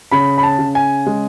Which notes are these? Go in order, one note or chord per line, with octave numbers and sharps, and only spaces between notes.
C#3 B5
B5
A5
C#3
G#5
G#3